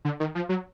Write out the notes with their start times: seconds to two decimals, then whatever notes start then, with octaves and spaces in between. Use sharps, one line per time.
0.05 D3
0.20 D#3
0.35 F3
0.49 F#3